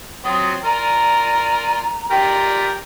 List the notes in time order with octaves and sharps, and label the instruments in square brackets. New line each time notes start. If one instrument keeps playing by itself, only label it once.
[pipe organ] F#3 F4 F#4 [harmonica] C4 [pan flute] D#6
[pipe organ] F4 D5 G#5 [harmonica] A#4 [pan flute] A#5
[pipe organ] F4 D5 E5 [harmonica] G4 A#4 G5